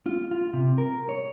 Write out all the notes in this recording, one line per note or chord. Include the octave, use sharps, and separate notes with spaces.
F4
F4
C3
A#4
C#5